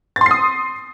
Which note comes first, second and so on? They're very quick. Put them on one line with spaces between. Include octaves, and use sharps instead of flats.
A6 C6 C7 D#6